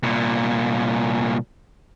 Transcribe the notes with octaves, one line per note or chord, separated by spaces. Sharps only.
C2 A#2